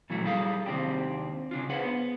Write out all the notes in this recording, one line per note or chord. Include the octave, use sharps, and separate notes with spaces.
A#2 E3 F#3 A3
G3 E4 G#4 A4 D5 F5
D#2 C3 C4 D4 G4
C#3 D4 F4
F4 G#4 B4 C5 F5 F#5
B3